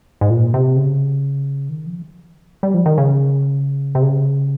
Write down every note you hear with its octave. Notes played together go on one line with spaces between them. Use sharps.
G#2
A#2
C3
C#3
D#3
F3
G3
F3
D#3
C#3
C3
C#3